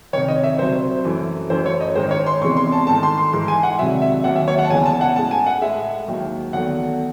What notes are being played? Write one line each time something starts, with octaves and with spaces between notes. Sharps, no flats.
C2 C3 D#3 C#5
D#5
E5
C2 C3 F#3 C5
F#2 E3 A3
F#2 E3 A3 C5
C#5
D#5
G#2 D#3 G#3 C5
C#5
C6
E2 C3 E3 G#3 C#6
C6
A5
G#2 D#3 A3 A5
C6
C6
G#2 E3 G#3 C6
G#5
F#5
C2 C3 D#3 F#3 E5
E5
D#2 D#3 F#3 F#5
E5
C#5
F#5
A5
E2 C#3 E3 G#3 G#5
A5
F#5
A2 G#3 A5
G#5
F#5
A2 G#3 E5
D#2 D#3 F#3
E2 D#3 F#3 A3 F#5